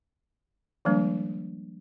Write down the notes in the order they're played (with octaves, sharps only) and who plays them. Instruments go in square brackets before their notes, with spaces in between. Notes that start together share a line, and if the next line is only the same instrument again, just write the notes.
[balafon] D#3 F3 G3 G#3 A#3 D4